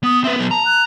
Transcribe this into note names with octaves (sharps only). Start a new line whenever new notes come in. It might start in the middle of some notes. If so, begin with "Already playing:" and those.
B3 D#6
C4 B4 E5
F#3 B3 B4
A5 A#5
F#6